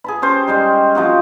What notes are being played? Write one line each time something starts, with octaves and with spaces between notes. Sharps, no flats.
G#4 A5 B5
C#4 G4 C5 A5
G3 G#3 D#4
C3 F3 D#4 F#4